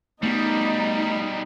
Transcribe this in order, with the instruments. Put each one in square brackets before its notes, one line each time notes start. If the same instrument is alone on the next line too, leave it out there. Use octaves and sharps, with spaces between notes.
[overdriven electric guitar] B2 G3 [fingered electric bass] A3 B3 [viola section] D#4